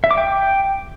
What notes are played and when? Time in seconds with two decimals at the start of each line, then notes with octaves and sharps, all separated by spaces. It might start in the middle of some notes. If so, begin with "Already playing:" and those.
0.04 E5
0.11 D6
0.18 G5